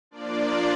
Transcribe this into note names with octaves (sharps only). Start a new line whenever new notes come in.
F3 A#3 D4 F4 D5